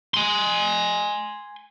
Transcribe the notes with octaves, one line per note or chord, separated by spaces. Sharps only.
G#5 C6